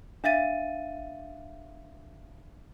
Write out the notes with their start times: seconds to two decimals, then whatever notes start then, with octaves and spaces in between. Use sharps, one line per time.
0.24 D4 E5 F5 A6 D#7